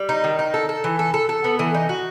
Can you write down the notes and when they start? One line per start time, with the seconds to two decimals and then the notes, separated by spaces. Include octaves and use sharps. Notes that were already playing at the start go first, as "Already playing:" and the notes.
Already playing: G3
0.09 D#4
0.24 D#3
0.39 D#4
0.54 A4
0.69 A4
0.84 E3
0.99 A4
1.14 A4
1.29 A4
1.44 B3
1.59 E3
1.74 D#4
1.89 F#4